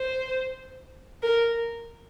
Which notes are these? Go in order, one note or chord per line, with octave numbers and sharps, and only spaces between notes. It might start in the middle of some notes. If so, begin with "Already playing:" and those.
Already playing: C5
A#4